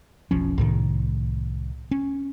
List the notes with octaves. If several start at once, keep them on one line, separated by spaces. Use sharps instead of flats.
F1 B1 F3 C#4
C2 A2 D#3
C#4